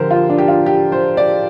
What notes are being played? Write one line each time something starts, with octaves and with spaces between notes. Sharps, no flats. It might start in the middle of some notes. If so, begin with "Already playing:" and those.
Already playing: D3 F3 G4 A#4 C5
F4
D4
G4
F4
G4
C5
D5